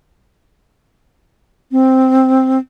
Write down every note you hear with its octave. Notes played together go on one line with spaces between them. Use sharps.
C4